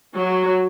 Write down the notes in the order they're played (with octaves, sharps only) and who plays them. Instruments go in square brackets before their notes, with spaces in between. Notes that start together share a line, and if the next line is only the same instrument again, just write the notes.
[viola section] F#3